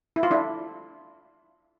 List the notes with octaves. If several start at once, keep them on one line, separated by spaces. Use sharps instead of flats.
E4
F4
D4 E4